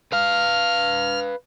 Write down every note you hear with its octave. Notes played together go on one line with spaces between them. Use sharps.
B4 F5 F6